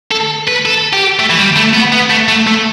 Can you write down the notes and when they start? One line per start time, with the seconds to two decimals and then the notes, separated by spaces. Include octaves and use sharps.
0.11 A4
0.48 B4
0.66 A4
0.93 G4
1.19 A3
1.30 E3
1.39 G3
1.56 A3
1.74 B3
1.92 B3
2.10 A3
2.28 A3
2.47 A3